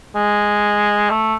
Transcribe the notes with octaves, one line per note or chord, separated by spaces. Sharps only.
G#3
A3